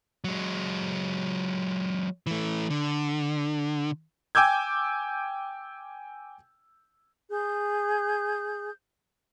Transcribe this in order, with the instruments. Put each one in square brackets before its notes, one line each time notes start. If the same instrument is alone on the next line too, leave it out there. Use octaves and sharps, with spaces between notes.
[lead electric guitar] F#3 G#3
E3 A3
D3
[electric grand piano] G5 G#5 D6 E6 G6 G#6
[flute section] G#4 G6